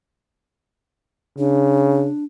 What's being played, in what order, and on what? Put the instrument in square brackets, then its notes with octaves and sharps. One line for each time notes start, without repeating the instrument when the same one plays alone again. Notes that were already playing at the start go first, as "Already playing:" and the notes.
[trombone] C#3 [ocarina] D4